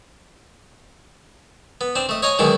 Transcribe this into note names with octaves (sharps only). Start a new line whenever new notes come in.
B3
C4 D4
A3 D#5
C#5 D#5 F5 G#5 A#5
F#2 B2 D3 D#3 G#3